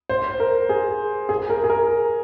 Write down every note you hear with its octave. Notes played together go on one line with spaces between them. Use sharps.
C5
A#4
G#4
G#4
A#4
G#4
A#4